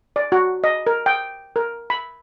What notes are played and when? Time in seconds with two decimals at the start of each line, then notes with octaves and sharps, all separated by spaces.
0.16 D5
0.32 F#4
0.64 D#5
0.87 A#4
1.06 G5
1.56 A#4
1.90 B5